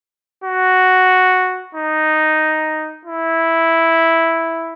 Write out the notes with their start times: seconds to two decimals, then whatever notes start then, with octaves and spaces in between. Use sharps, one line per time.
0.44 F#4
1.75 D#4
3.05 E4